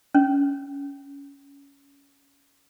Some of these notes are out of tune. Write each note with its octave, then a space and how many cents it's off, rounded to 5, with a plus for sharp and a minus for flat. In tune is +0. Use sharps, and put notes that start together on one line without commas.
C#4 +15